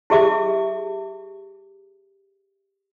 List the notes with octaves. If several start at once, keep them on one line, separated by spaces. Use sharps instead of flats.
E4 G4 G#4 E5 D6